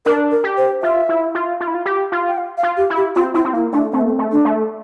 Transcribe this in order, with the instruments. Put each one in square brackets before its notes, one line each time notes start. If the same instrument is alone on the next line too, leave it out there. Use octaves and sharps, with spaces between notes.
[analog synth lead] D4 [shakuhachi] A#4
[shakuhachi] A#4
[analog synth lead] G4
[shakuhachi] C5
[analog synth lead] F4 [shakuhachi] E5
[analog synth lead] E4
F4
F4
E4
F4
G4
F4
[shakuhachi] G5
F5
F5
[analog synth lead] F4
[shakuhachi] G4
[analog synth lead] E4
[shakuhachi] G4
[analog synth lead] C4 [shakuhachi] F4
[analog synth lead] C4 [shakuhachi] E4
[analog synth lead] C4
[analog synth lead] A#3 [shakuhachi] E4
[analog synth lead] A3 [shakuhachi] D4
[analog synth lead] A3 [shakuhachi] C4
[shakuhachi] A#3
C4
[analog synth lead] A3
[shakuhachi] D4
[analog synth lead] A3